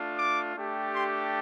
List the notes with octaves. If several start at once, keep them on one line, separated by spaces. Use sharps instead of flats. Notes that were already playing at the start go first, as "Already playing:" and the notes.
Already playing: A3 D4 F4
D6
A3 D4 G4
C6